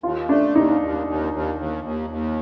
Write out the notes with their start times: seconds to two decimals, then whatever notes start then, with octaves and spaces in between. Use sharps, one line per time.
0.03 D#2 F4
0.29 A3 D4
0.55 D#2 D#4
0.81 D#2
1.07 D#2
1.33 D#2
1.58 D#2
1.84 D#2
2.10 D#2